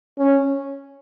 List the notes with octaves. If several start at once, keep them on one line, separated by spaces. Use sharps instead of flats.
C#4